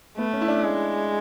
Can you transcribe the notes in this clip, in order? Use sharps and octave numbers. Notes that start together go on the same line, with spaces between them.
A3 B3
C#4
E4
D4
G#3